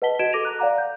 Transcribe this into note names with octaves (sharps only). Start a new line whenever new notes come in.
B4 D#5 F#5 A5 B6 G7
F#4 D#5 G#6 D7 E7
A4 D6 A#6 D#7 F7
A#5 F#6
D5 F5 F#5 A#5 D6
G6